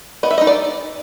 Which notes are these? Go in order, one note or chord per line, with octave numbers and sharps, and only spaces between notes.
B3 D#5
E5
D#5
D#4
D5